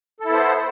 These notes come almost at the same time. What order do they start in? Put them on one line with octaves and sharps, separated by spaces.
A4 E4 B3 C5